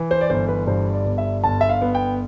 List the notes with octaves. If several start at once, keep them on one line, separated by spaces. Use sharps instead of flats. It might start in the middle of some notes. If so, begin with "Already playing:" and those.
Already playing: E3
C5
D5
G1 C5
B4
G2 C5
D5
G1
E5
G1 A5
E5
F5
B3
G5